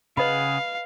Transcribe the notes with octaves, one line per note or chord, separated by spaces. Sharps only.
C#3 G#4 B4 D#5 F5 F#5 B5